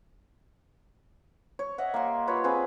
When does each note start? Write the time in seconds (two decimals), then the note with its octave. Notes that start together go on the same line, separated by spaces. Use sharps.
1.59 C#5
1.78 D#5 E5 F#5
1.94 A#3 G4 C6
2.27 F4 B4 C#5
2.44 C4 G#4 B4